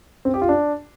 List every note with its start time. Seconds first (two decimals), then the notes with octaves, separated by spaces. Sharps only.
0.25 C4
0.34 G4
0.42 F4
0.49 D4